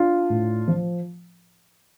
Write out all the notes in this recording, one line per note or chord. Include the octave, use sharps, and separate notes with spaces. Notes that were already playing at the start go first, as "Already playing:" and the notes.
Already playing: D4 F4
A2
F3